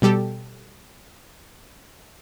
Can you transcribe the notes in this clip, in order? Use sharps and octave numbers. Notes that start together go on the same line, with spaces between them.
B2 G3 G4 A4